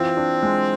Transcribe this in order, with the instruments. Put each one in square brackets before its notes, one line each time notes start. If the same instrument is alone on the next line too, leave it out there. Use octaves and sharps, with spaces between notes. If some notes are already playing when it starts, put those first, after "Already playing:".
Already playing: [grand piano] E3 F4 [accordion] C4
[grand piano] D4
G#3